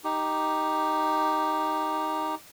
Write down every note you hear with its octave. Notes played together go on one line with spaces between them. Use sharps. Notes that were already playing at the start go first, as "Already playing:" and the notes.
D#4 G4